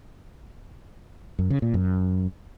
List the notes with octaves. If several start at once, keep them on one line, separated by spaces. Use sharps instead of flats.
F#2
C#3
A#2
F#2